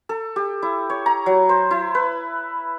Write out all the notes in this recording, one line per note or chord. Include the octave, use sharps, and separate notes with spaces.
A4
G4
E4
C#5
A#5
F#3
C5
E4
B4